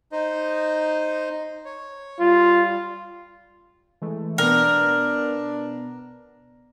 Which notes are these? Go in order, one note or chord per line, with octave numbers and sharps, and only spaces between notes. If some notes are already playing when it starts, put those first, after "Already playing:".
D#4 C5 D#5
C#5
G3 F4
E3 G#3 A3
B2 B3 D4 A#4